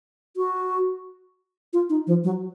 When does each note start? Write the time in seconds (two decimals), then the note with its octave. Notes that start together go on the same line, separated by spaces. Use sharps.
0.37 F#4
1.73 F4
1.90 D#4
2.07 F3
2.24 F#3